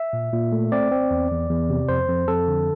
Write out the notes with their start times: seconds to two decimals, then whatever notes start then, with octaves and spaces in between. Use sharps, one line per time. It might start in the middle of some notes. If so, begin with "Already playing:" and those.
Already playing: E5
0.13 A#2
0.33 A#2
0.52 A3
0.72 C4 D5
0.91 C4
1.11 E2
1.31 E2
1.49 E2
1.70 C3
1.89 F2 C5
2.09 F2
2.28 F2 A4
2.48 D3